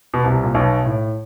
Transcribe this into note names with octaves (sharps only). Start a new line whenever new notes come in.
B2
C2 C3
A#2
B1 B2
A2